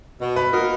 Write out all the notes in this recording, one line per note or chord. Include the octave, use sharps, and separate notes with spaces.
B2
B4
A#3 D#4 F#4 A#4